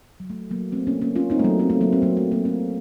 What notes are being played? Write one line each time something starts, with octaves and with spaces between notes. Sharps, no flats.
F#3
A3
F#3 A#3
A3 C4
A#3 C#4
A#3 C#4
C#4 F4
C4 D#4
A3
F#3 A#3
A3 C4
A3 C4
F#3 A#3
C4
F#3 A#3
A3
F#3 A#3
A3 C4